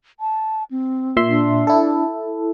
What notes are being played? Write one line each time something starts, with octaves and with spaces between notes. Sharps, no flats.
A5
C4
A#2 E5 C6
D4
E4 A4